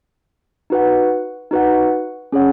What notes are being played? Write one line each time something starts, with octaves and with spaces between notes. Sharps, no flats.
D#4 F#4 B4 F#5
D#4 F#4 B4 F#5
C#4 G#4 C#5 F#5